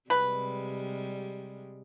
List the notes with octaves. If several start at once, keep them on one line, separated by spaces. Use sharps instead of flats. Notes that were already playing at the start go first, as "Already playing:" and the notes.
C3 G3 G#3 B4